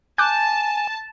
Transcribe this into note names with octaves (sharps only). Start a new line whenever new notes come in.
G#5 A5 D6 F#6 G6